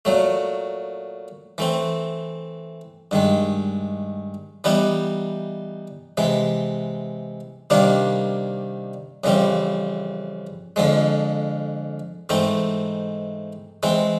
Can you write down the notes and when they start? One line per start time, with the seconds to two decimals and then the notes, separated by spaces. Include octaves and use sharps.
0.05 A#2 F#3 A3
1.58 E3 A3 C4
3.11 G2 D#3 G#3
4.64 E3 G3 B3 D#4
6.17 C3 E3 G#3
7.70 C3 D#3 G3 A#3 D4
9.24 F2 C#3 E3 G3 C4
10.76 F2 D3 F3 G#3
12.29 G#2 E3 A3 C4 D#4
13.83 E3 G#3 C4